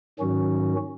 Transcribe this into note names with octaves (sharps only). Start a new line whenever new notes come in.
G#2 D#3 F#3 C#4 F#4